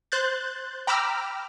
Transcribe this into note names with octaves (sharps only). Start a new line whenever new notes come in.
C5 F#6 G6 A6
G5 A#5 B5 D6 E6 F6